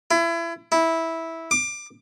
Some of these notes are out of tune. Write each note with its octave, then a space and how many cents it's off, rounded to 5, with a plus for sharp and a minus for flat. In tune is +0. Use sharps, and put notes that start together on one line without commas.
E4 +30
E4 -10
D6 +20